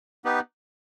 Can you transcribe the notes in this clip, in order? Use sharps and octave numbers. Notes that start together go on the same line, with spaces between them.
B3 D#4 G4 B4